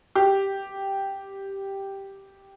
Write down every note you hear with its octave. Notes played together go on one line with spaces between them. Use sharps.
G4